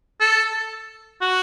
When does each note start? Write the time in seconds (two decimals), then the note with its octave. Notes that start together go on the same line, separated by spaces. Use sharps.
0.20 A4
1.22 F#4